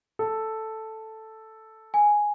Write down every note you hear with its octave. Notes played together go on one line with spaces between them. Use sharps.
A4
G#5